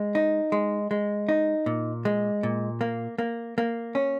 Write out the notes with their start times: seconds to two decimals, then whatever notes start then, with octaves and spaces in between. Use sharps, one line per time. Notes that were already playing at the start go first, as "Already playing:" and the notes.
Already playing: G#3
0.15 D#4
0.52 G#3
0.91 G#3
1.29 D#4
1.66 A#2
2.05 G#3
2.43 A#2
2.81 A#3
3.18 A#3
3.58 A#3
3.95 C#4